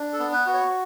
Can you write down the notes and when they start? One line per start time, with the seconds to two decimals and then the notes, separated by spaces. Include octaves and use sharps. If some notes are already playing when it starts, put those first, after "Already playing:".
Already playing: D4
0.13 A4
0.19 B3
0.33 B4
0.46 F#4
0.53 C#5